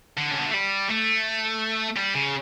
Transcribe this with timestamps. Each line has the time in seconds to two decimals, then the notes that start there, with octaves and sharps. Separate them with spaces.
0.18 D3
0.31 C#4
0.39 B3
0.46 A3
0.54 G3
0.90 A3
1.97 G3
2.15 C#3